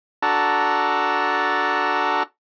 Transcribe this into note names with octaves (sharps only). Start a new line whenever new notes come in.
D4 F#4 A4 A#5